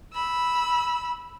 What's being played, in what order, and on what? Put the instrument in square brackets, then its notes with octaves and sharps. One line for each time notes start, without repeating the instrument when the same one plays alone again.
[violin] B5 E6